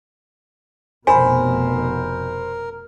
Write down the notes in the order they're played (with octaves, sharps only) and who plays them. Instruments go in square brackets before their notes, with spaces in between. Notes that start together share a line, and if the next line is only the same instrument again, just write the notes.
[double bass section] F1 B2 [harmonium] A#4 [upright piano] C5 B5 [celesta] G#5